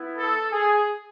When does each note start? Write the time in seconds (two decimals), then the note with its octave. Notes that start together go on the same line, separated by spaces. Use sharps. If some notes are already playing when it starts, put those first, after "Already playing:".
Already playing: B3 E4
0.18 A4
0.52 G#4